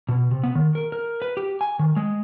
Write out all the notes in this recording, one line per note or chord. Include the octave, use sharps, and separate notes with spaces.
B2
C3
B3
D#3
A#4
A#4
B4
G4
G#5
D#3
G#3